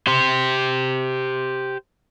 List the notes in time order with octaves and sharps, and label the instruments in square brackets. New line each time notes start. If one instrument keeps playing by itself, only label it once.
[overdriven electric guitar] G4 C5